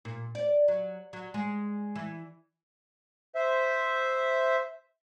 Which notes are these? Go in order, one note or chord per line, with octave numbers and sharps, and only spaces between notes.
A#2
D5
F#3
F#3
G#3
E3
C5 E5